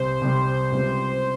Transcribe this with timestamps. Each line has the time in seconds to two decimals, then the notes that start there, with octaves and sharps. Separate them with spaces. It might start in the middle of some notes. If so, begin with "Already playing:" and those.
Already playing: C2 C3 G3 C5
0.21 C2 C3 G3
0.72 C#2 C3 G3